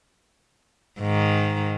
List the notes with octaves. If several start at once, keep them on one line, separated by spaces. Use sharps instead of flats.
G#2 D#3